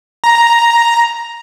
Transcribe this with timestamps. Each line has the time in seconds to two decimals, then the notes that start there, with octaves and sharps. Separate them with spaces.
0.24 A#5